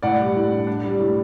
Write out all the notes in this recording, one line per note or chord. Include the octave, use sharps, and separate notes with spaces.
A2 D5 F#5
G3
A2
D4
D4
G3
A2